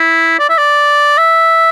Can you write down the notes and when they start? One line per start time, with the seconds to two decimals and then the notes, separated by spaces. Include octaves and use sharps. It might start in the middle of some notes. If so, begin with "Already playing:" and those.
Already playing: E4
0.39 D5
0.49 E5
0.57 D5
1.18 E5